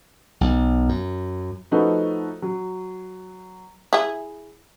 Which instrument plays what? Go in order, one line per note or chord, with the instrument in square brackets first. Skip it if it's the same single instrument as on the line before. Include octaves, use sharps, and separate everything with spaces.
[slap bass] B1
F#2
[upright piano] F3 A3 D#4 F#4 A4 B4
F#3
[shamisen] E4 G#4